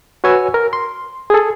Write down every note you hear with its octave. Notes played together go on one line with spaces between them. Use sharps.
F#4 B4 C#5 G#5 E6
A#4
C6
G#4 A4